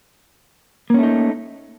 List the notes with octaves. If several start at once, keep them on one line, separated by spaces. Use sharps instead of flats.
A3 A#3 C#4 D#4